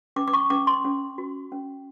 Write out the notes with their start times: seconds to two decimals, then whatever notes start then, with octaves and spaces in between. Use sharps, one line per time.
0.16 C#4 D6
0.28 D6
0.33 C#6
0.50 C#4 D6
0.67 C6
0.84 C#4
1.18 F#4
1.52 C#4